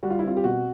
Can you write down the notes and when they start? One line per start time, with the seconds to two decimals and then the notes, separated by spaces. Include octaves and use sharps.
0.03 G3 F#4
0.10 F4
0.19 E4
0.24 C4 F4
0.37 G4
0.44 B2 F#4